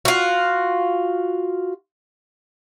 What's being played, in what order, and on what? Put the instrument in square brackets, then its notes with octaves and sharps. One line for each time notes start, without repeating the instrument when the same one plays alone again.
[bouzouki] F4 F#4